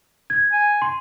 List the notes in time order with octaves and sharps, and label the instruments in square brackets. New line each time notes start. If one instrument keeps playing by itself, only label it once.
[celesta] G#6
[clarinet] G#5
[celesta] C6